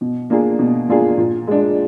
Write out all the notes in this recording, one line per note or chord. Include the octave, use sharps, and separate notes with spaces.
B2
A#3 D4 F4 G#4
B2
A#3 D4 F4 G#4
A#2
G#3 D4